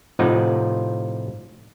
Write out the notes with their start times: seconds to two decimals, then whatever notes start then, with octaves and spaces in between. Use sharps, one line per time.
0.19 A2 C3 F3 D#4 F4 F#5